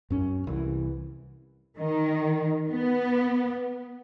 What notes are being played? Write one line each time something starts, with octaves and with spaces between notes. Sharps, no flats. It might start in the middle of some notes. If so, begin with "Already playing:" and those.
F#2 C#4
C2 E3
D#3
B3